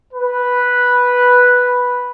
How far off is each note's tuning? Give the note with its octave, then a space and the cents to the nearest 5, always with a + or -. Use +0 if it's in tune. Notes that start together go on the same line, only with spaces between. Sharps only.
B4 -5